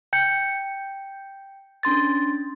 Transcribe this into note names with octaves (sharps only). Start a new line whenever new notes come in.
G5 G6 C#7
C#4 D4 C6 A6